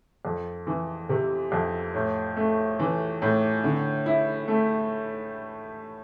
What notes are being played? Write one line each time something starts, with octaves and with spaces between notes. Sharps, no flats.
F2
E3
C3
F2
A2
A3
E3
A2
D3
E4
A3